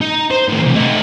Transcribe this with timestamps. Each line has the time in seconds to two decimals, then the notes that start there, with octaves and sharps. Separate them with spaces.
0.01 D#4
0.31 C5
0.48 A2 D#3
0.63 E2 C3
0.74 A3 D#4